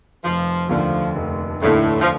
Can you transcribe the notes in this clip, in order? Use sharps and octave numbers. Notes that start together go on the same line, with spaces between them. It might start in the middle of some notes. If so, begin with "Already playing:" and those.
F1 F3
D#2 D3 F3 A3 D4
F1
D#2 A2 D3 A3 D4
F3